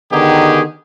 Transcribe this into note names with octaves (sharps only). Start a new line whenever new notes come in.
D3 D#3 B3 D#4 G4 G#4